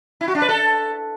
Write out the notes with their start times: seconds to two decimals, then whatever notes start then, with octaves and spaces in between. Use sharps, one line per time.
0.21 E4
0.28 F#4
0.35 D4
0.42 B4
0.49 A4